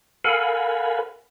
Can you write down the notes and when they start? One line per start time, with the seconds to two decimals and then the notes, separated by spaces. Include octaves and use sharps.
0.24 A4 A#4 F5 F#5 G#5 B5